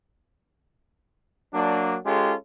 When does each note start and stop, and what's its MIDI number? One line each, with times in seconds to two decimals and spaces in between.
1.54 1.97 54
1.54 1.97 58
1.54 1.97 62
2.06 2.34 56
2.06 2.34 61
2.06 2.34 65
2.06 2.34 67
2.06 2.34 69